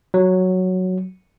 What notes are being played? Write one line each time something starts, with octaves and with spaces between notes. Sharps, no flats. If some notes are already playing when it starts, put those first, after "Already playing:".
F#3